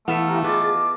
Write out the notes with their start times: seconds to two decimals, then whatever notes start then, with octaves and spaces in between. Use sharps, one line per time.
0.08 E3 A3 B3 E4 A4 E5 F5
0.27 G4 A#5
0.44 F4 G#4 B4 D#5 D6 A6